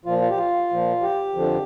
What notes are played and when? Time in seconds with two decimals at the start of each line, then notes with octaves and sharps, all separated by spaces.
0.05 A#2 F3 F4
0.21 F4
0.30 G4
0.37 F4
0.70 A#2 F3
1.02 G4
1.34 F2 D3 F3